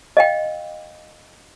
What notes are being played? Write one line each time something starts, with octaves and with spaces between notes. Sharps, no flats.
D#5 F5 G5